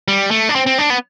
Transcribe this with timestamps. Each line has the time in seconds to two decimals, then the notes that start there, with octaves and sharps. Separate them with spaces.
0.08 G3
0.31 A3
0.49 D4
0.55 C4
0.66 C4
0.78 D4
0.90 B3